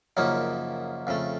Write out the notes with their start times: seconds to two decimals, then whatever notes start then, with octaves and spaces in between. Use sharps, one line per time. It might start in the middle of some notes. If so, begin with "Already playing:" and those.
0.17 F#2 C#3 F3 A#3 C#4 D#4
1.07 F2 C#3 A3